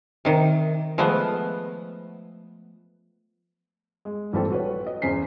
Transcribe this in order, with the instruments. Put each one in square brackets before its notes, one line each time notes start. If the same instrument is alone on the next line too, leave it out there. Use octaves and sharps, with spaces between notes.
[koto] C3 D#3
F3 G#3 A3 B3
[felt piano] G#3
A#1 E3 G3 C4 A4 A5
F#4 B4 C#5
D#5
E2 C#3 C5 G#5 B6 C7